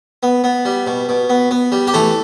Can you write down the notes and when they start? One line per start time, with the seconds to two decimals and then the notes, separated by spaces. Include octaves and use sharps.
0.23 B3
0.44 B3
0.65 G3
0.87 B2
1.09 B2
1.29 B3
1.51 B3
1.72 G3
1.87 G4
1.94 E3 A3 A4